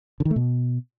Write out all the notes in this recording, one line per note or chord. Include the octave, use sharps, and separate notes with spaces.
D3
D#3
A3
B2